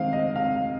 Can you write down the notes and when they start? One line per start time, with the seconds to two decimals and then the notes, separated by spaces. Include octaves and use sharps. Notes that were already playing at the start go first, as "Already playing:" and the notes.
Already playing: D#3 G#3 C4 F5
0.13 D#5
0.36 F5